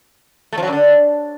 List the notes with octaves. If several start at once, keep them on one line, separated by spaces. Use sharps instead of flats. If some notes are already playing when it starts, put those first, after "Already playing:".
A3
F3
F#3
F#2
D3